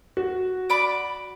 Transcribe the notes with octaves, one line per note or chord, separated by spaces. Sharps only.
F#4
D5 B5 D6